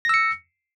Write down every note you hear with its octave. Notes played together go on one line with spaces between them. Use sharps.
E6 A#6 C#7